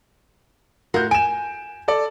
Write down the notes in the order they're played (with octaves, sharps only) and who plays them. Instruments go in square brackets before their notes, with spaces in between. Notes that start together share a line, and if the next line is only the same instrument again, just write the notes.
[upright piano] A2 G6 [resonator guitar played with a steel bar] F4 F#4 A#4
[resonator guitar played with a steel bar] G#5 [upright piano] D7 E7
[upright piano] A4 D5